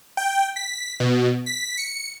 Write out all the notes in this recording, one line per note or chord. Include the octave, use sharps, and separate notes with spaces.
G5
B6
B2
B6
C#7